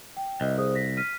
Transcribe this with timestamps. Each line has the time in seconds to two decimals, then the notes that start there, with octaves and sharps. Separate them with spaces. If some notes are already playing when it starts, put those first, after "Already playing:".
0.17 G5
0.41 C2 D#5
0.58 G#4 C5 D#6
0.75 A#6 B6
0.97 F6 B6 D#7